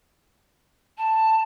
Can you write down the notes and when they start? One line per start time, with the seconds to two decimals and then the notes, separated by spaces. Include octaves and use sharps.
0.97 A5